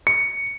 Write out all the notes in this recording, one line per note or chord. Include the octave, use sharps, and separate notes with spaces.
C#7